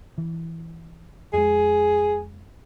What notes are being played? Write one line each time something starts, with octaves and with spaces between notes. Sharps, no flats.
E3
F2 G#3 G#4